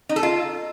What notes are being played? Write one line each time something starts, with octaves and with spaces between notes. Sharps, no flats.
D#4
A4
F4